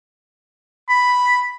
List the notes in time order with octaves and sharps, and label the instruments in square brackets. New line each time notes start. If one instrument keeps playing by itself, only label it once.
[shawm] B5